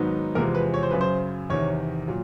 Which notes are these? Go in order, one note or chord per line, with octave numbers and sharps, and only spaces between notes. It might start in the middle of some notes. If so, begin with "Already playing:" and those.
Already playing: G#2 D#3 F#3 B3 D#4
E2 C3 F3 G#3 A#4
B4
C#5
C5
F#2 C#3 F#3 B4
C5
E2 C3 D#3 C#5
A#2 F#3